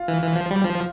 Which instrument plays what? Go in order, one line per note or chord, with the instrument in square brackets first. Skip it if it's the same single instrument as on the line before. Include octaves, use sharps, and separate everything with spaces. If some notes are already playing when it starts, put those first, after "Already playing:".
Already playing: [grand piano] F4
[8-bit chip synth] E3
E3
F3
G3
F3